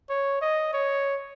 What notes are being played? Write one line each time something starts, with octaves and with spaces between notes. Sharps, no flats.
C#5
D#5
C#5